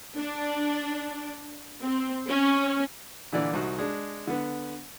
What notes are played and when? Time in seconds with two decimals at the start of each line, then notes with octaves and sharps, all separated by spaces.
0.18 D4
1.82 C4
2.28 C#4
3.32 A#2 D3 E3 D5
3.53 C2 D#4 F#4
3.78 G#3 D4
4.27 D3 B3